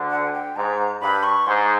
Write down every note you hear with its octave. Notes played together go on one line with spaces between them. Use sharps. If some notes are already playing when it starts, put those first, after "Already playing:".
Already playing: D2 D3
F#5
G#5
G5
G#2 A#5
G2 B5
C#6
G#2 C6